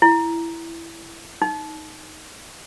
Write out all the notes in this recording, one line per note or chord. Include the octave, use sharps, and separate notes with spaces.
E4
D#4